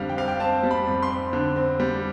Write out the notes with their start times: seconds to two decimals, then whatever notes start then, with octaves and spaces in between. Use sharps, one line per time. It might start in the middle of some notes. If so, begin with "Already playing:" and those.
Already playing: F2 D3 G3 F5
0.09 G5
0.17 C4 F5
0.28 G5
0.40 C4 A5
0.63 G3
0.71 B5
0.86 F2
1.03 C6
1.10 C4
1.33 D3
1.56 C4
1.80 G3